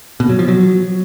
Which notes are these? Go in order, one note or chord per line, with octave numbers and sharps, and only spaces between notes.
B2
F#3
F3
F#3